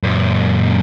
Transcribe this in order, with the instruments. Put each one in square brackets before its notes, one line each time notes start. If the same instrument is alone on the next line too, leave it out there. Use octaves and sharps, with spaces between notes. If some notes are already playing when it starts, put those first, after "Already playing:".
[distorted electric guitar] F#2 A#2